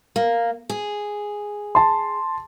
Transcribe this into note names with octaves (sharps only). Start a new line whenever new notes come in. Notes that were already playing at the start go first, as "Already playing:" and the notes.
A#3
G#4
A5 C6